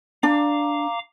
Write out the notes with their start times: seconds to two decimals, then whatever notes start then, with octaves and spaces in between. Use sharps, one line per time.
0.23 D4 F5 A#5 D6